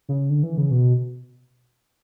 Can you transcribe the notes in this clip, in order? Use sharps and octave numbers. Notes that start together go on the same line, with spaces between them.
C#3
D3
E3
C#3
B2